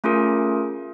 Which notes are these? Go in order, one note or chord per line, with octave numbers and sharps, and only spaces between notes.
A3 C#4 F4 G#4 A#4